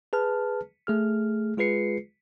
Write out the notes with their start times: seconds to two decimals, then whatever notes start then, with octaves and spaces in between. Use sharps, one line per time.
0.13 G#4 B4 A5 F6
0.87 A3 G#4 F6
1.57 G#3 F4 G#4 B4 C7 C#7